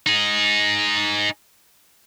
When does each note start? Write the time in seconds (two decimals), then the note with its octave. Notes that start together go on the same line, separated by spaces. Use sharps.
0.07 D#4 G#4